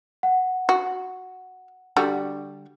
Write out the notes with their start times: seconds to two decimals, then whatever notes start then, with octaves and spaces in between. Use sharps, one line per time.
0.23 F#5
0.69 F#4
1.97 D3 G3 F#4